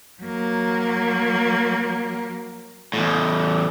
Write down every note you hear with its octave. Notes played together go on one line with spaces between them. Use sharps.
F#3 A#3
E2 A2